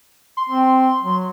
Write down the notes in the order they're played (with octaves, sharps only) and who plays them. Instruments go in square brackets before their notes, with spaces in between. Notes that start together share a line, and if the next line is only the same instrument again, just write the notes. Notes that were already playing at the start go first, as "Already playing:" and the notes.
[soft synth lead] C6
[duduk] C4
F#3